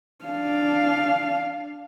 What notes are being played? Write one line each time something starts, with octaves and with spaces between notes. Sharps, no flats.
D4 F5